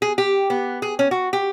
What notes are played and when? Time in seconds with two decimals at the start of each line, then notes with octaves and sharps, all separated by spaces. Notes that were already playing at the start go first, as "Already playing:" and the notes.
0.02 G#4
0.18 G4
0.50 B3
0.82 G#4
0.99 C#4
1.11 F#4
1.33 G4